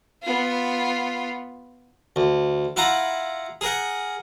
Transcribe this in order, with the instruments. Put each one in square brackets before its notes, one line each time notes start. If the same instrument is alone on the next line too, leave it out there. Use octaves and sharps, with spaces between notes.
[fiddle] B3 F4
[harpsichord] D2
E4 F4 F#5 A#5
G#4 A#4 F#5